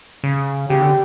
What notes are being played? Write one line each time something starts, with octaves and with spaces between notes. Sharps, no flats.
C#3
C#3 G4
D3